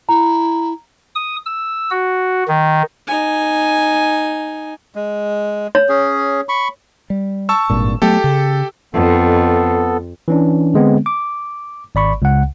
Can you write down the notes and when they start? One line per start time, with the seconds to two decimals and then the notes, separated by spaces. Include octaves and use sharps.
0.09 E4 A#5
1.15 D#6
1.45 E6
1.90 F#4
2.48 D#3
3.07 D#4 G#5
4.95 G#3
5.75 C#5
5.89 C#4 G#4
6.49 B5 C#6
7.10 G3
7.49 A5 C#6 E6
7.70 G#1 G2 A#2
8.02 F#3 A3 B3 G4 A4
8.24 C#3
8.94 F2 B3 A4
10.28 E3 C#4 D4
10.74 D3 G#3 B3 C4
11.06 D6
11.95 G#1 D5 B5 C#6
12.22 C#2 C#3 F#5